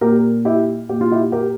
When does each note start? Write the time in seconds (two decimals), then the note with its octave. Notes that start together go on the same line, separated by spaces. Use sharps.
0.01 A#2 G4 A#4
0.45 E4 G4
0.89 A#2 G4
1.01 F4
1.12 E4 G4
1.32 G4 A#4